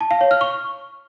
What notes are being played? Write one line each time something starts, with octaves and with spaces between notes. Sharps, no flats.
A5
F5
C#5
F6
C#6